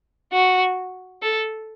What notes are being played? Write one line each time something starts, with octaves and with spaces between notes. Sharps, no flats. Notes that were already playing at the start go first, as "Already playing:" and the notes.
F#4
A4